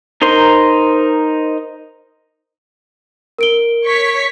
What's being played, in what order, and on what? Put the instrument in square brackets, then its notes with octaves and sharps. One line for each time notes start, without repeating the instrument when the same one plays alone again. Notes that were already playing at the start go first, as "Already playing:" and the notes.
[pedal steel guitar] D#4 A#4 C5 C6
[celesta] A#4 D7 G7
[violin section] C#5 C#6 B6